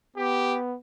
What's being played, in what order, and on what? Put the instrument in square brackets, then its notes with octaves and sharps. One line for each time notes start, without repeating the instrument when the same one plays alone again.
[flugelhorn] B3 [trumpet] G4